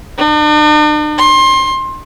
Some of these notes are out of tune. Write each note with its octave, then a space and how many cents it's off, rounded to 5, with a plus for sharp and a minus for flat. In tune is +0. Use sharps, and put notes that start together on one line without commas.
D4 +45
C6 +25